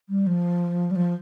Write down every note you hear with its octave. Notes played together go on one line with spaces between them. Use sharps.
G3
F3
G3
F3